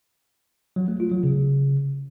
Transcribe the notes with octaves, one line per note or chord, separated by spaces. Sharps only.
F#3
A3
F4
F#3
C#3